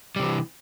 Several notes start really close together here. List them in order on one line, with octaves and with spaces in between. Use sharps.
G3 C3 E3